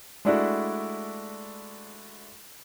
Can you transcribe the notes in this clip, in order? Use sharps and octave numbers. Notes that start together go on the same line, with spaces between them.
G#3 A3 D4 E4 F#4 D5